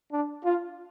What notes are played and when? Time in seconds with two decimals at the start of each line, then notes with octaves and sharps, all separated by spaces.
0.10 D4
0.44 F4